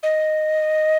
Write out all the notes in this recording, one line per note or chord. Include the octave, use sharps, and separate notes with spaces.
D#5